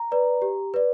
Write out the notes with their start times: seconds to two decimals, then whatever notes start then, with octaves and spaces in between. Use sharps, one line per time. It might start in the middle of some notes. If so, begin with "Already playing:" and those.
Already playing: A#5
0.12 B4 D5
0.42 G4
0.74 B4 D5